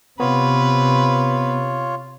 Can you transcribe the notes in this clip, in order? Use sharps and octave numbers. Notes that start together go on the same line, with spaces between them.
C3 B3 F4 B4 C#5